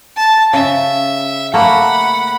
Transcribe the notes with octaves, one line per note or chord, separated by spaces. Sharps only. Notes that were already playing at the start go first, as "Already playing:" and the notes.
A5
C#3 E5
A3 A#3 F#5 B5